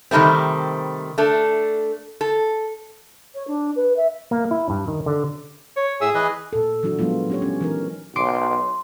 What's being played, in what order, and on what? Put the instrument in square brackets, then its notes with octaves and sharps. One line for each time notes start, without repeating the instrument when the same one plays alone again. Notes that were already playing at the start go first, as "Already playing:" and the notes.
[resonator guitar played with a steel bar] C3 D#3 G3 A3 C4
A3 D4 A4
A4
[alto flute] C#5
D4
B4
E5
[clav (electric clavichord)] A#3
E4
G2
D#3
D3
[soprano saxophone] C#5
[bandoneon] A2 E5 E6 [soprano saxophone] G#4
[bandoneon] E3 B4 D#5
[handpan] A#2 A4
E3 F#3 D4 E4 F#4
F3 F#3 G#3 B3 F4
C#4 G4 C#5
C#4
E3 D#4 A#4
[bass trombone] B1 [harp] C6 D6 D7